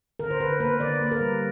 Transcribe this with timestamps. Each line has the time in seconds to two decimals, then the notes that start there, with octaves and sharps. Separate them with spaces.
0.19 D3 A#4
0.31 C5
0.40 D3 B4
0.60 A#3 B4
0.80 D3 D5
1.01 A#3
1.12 A#4
1.21 G3